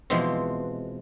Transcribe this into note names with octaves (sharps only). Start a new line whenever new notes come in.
B2 E3 F3 G#3 C4